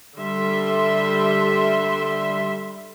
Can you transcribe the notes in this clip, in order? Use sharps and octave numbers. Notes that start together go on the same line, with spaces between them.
D3 G3 E5 C6